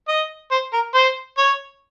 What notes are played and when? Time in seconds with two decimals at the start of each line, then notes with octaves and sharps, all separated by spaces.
0.08 D#5
0.51 C5
0.73 A#4
0.94 C5
1.37 C#5